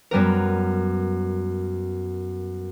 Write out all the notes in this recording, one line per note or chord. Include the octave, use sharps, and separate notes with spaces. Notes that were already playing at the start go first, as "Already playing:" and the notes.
F#2 G3 B3 A#4